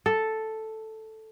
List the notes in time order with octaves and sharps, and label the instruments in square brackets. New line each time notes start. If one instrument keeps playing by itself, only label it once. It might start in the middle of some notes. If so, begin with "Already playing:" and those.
[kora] A4